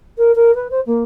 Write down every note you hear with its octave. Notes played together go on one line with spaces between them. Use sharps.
A#4
A#4
B4
C5
A#3